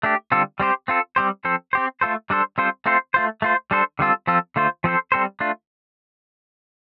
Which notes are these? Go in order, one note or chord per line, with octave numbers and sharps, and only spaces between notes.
A3 D4 G4
D3 G3 C4 F4 A4
G3 C4 G4 C5
C4 F4 A4
G3 C4 G4 C5
F3 C4 A4 C5
C4 G4 C5
A3 F4 A4 C5
G3 D4 A4 C5
G3 C4 F4 A4 C5
A3 C4 F4 A4 C5
A3 F4 C5
A3 F4 C5
G3 D4 A4 C5
D3 G3 C4 F4 A4
F3 C4 F4 A4
D3 A3 F4 C5
F3 C4 A4 C5
G3 C4 A4 C5
A3 D4 F4